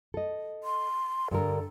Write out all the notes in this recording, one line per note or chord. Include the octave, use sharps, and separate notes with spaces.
A4 D#5
C6
G2 D3 A4 A#4